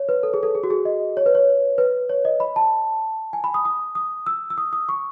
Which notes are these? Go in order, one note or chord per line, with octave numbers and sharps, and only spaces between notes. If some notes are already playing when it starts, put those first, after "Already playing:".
Already playing: C#5
B4
A4
G#4
A4
G#4
F#4
G#4
D#5
C#5
B4
C#5
B4
C#5
D#5
B5
A5
G#5
B5
D#6
D#6
D#6
E6
E6
D#6
D#6
C#6